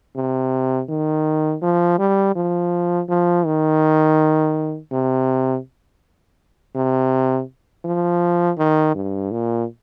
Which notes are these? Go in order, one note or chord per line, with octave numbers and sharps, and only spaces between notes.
C3
D#3
F3
G3
F3
F3
D#3
C3
C3
F3
D#3
G2
A#2